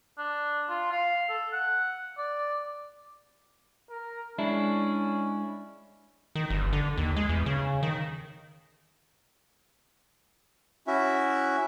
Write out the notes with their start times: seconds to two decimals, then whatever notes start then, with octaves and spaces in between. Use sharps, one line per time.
0.18 D4
0.69 F4
0.92 F5
1.29 A4
1.52 F#5
2.18 D5
3.90 A#4
4.39 G#3 C#4 D4 E4
6.36 D#3
6.50 G1
6.73 D3
6.98 D#2
7.16 G#3
7.29 E2
7.46 C#3
7.83 D#3
10.87 C#4 E4 F#4 E5